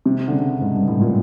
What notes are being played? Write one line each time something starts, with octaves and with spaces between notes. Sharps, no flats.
C3
D3
C#3
G#2
G2
A2
A#2